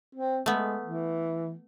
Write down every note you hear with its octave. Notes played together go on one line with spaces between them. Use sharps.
C4
G#3 A3 B3
E3